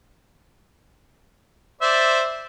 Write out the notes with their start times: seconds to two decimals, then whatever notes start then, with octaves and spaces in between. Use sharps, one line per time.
1.82 C5 D5 E5